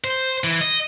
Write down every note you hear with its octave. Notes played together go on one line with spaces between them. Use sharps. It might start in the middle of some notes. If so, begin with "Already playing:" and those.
C5
E3
D#5